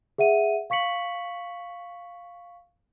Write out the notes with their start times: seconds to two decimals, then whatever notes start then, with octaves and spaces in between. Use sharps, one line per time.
0.18 G#4 E5 F#5 D#7
0.70 F5 C#6 B6 C#7 F#7